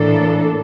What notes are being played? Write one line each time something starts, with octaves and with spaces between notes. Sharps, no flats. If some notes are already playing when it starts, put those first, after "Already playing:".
Already playing: A2 E3 A#3 D4 A4